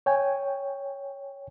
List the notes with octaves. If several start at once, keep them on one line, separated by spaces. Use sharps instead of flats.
C#5 G5 G#5